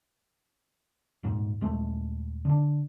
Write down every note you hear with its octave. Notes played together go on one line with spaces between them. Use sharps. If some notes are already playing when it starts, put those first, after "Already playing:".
D#1 D#2 G#2
D#1 G#3 A3
D3 D4